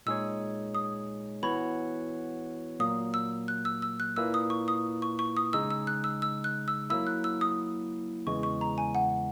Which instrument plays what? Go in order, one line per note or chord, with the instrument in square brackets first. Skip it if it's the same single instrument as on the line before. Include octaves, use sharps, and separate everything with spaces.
[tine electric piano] A#2 G#3 D#4 G#4 C#5 [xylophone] E6
[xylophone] D#6
[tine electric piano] E3 B3 F#4 C#5 [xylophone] B5
[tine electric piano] A#2 F#3 A#3 [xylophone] D#6
[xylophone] E6
F#6
E6
E6
F#6
[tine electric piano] A#2 A#3 E4 B4 [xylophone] E6
[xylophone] D#6
C#6
D#6
C#6
C#6
D#6
[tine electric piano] C#3 G#3 D#4 G#4 [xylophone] E6
[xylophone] E6
F#6
E6
E6
F#6
E6
[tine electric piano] F#3 A#3 E4 [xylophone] E6
[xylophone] F#6
E6
D#6
[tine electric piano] E2 C#3 E3 G#3 [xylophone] C#6
[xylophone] C#6
A#5
G#5
F#5